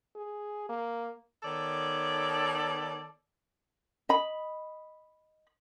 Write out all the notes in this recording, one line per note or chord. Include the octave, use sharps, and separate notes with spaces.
G#4
A#3
D#3 B3 A4 C#5 D5
D#5 B5